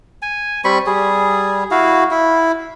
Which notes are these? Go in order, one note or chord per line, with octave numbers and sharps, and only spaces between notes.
G#5
G3 C4 B5 C#6
G3 G#4
E4 F#4 F5
E4